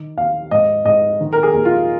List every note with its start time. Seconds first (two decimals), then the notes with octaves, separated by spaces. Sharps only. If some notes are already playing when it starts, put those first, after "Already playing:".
Already playing: D#3
0.17 D#2 F5
0.51 G#2 D#5
0.85 G#2 D#5
1.20 D#3
1.33 A#4
1.43 G#4
1.54 D#2
1.65 F4